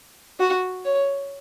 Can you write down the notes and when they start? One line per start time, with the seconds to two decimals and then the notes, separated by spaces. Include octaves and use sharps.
0.40 F#4
0.85 C#5